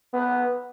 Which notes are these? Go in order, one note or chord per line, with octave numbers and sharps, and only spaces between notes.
B3